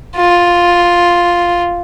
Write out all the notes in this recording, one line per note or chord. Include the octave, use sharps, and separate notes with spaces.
F4